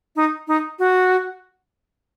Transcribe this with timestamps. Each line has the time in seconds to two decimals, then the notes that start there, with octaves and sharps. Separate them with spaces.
0.16 D#4
0.48 D#4
0.79 F#4